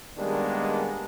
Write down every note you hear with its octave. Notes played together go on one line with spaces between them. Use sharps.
D#3 G3 G#3 A#3 B3 D4